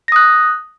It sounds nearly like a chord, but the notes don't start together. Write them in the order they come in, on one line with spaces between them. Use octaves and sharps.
A#6 D#6 F#6